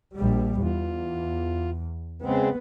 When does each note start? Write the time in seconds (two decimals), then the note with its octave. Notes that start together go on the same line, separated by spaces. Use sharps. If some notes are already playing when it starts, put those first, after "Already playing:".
0.16 A#1 G3
0.61 E2 F4
2.22 C#3 G#3 B3 C4